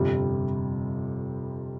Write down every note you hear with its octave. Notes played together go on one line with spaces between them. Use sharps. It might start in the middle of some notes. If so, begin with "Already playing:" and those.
Already playing: G1 F2 C3 G3